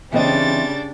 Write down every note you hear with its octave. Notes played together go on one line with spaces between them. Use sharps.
C#3 E3 G3 C4 D4 D#5 A6